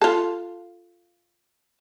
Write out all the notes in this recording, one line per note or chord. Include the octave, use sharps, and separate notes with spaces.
F4 A4